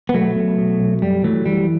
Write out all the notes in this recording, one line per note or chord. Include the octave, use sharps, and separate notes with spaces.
B3
B1 F#3 A3
B2
B2
B1
F#2 G3
E3 F#3 A3
E3 G3